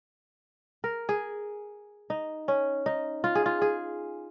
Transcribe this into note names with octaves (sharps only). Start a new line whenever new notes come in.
A#4
G#4
D#4
C#4
D#4
F4
G#4
F4
G#4